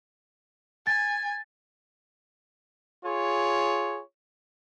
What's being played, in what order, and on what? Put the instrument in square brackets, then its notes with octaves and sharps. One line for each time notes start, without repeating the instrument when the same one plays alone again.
[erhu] G#5 [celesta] A6
[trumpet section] F4 G#4 C#5